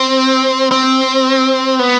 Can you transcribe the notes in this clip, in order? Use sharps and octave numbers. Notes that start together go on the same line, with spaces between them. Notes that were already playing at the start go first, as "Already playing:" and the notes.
Already playing: C4
C4
B3